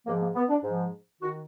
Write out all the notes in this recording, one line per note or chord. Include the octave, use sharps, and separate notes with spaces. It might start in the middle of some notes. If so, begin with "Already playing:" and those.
G#2 F3 A#3
A#3
B3
D4
G#2 F3
D#3 F#4